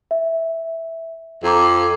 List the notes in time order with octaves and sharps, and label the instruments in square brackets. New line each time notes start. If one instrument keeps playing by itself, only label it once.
[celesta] E5
[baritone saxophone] F2 [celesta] F4 A#5 D6